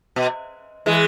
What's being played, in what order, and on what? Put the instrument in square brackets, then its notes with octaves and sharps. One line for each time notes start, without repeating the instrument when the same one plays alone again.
[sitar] B2
E3 G#3